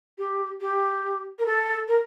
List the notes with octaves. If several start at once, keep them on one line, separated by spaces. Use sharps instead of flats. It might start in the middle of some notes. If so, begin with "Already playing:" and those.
G4
G4
A#4
A4
A#4